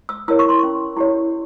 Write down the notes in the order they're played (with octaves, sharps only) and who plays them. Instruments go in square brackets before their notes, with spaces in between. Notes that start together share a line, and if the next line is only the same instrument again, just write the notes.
[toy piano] E6
E4 A#4 C#5 E6
C#6
C6
C#4 C#6
E4 G4 C#5